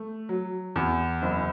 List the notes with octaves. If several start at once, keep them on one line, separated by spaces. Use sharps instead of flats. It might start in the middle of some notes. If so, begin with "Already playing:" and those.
Already playing: A3
F#3
E2
F#1